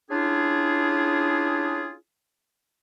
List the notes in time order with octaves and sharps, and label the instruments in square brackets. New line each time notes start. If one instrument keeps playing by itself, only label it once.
[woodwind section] C#4 D4 E4 F4 G4 G#4